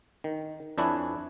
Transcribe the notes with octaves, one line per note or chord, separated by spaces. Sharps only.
D#3
F2 D4 E4 B4 C#5 G#5